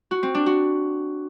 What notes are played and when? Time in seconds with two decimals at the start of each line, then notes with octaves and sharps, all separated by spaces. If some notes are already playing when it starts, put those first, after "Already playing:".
0.11 F#4
0.23 C4
0.34 D4
0.46 F#4